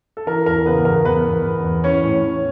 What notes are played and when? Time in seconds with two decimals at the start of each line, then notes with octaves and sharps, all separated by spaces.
0.17 A4
0.27 E3 A#4
0.46 E2 A#4
0.66 C#3 B3 B4
0.85 E2 A#4
1.05 E2 B3 B4
1.25 E2
1.45 E2
1.65 E2
1.84 E3 C#4 C#5
2.04 A2
2.24 E3